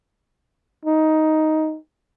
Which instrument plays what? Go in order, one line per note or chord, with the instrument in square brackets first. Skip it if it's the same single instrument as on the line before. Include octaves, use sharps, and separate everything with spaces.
[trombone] D#4